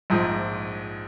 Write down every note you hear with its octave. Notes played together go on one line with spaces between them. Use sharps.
A#1 G#2 F3